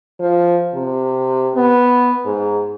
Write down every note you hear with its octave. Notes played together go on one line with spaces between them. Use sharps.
F3
C3
B3
G#2